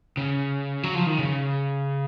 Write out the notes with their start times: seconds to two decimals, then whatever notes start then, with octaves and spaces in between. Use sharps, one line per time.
0.17 C#3
0.83 F#3
0.95 F3
1.07 D#3
1.19 C#3